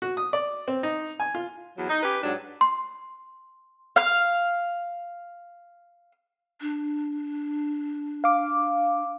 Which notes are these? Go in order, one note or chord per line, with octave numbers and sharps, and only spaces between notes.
F#4
D#6
D5
C4
D#4
G#5
F4
E2 F#3
D#4
C#4 G4 B4
G#2 F#3 D4
C6
F5 F6
D4
F5 D6